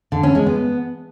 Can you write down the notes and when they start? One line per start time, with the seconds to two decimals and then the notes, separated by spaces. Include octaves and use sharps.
0.12 D3
0.23 C#4
0.35 G#3
0.46 B3